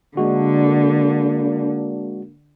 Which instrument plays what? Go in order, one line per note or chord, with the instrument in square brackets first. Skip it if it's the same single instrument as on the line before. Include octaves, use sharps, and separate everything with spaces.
[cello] D3 [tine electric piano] G#3 F#4 [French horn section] A#3 D4